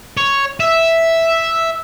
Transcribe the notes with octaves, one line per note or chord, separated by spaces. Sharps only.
C#5
E5